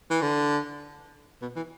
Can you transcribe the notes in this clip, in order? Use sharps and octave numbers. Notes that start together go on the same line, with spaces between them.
E3
D3
B2
E3